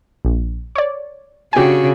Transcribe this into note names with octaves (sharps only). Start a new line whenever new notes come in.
A#1
C#5 D5
C#3 D4 F#4 G4 G#5